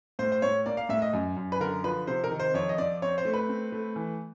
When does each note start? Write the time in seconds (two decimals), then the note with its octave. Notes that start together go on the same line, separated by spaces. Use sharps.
0.19 A2 C5
0.32 C5
0.42 A2 C#5
0.66 A#3 D5
0.77 F5
0.89 A2 E5
1.02 D#5
1.13 F#2
1.36 F#2
1.52 B4
1.60 D3 A#4
1.84 F3 B4
2.07 C3 C5
2.24 A#4
2.31 D#3
2.40 C5
2.54 F2 C#5
2.69 D#5
2.78 F2 D5
3.02 C4 C#5
3.18 C5
3.25 A3
3.34 B4
3.49 C4
3.72 A3
3.96 E3